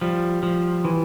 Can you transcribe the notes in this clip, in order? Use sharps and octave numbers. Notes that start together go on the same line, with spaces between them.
F3 G3
F3
E3